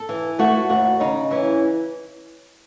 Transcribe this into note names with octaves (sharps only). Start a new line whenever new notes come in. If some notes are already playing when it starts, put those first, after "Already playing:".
Already playing: A4
E3
A3 F#4
D#2 F#4
C#3 D#4
E3 C#4